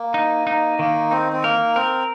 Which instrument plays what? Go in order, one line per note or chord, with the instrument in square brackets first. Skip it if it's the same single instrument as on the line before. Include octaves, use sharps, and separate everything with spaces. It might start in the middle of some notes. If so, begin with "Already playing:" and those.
Already playing: [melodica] A#3
[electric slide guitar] D#4
D#4
[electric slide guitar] D#3 [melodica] A#3
[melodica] C4 [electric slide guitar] D#4
[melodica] C4
[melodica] A#3 [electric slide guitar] A#4
[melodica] C4 [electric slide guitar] A#4